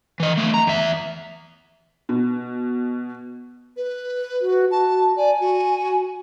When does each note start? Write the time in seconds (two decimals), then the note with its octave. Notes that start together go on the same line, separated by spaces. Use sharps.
0.20 E3 D#5
0.37 A3 D#5
0.54 A#5
0.67 E2 E5
2.09 B2
3.77 B4
4.41 F#4
4.71 F#4 A5
5.17 D5 G#5
5.41 F#4